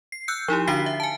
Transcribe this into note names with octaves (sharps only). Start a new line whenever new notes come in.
C7
E6 F#6 G6 C#7
F3 D#4 E4 G4
D3 D4 F#4 F5 B6 C7
E5
G#5 A5